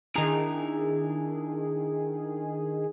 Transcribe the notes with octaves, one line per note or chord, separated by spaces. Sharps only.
D#3 D4 E4 G#4 A#5